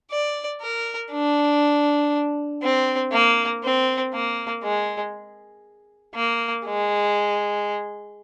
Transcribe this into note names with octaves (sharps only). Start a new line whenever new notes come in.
D5
A#4
D4
C4
A#3
C4
A#3
G#3
A#3
G#3